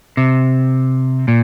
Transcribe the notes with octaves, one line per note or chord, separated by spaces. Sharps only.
C3
A#2